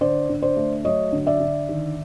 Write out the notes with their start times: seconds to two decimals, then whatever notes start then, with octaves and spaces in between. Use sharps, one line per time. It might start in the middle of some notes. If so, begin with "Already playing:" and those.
0.01 D3 C5 D5
0.29 D3
0.42 C5 D5
0.56 A3
0.85 F#3 C#5 D#5
1.12 D3
1.27 D5 E5
1.40 D3
1.69 D#3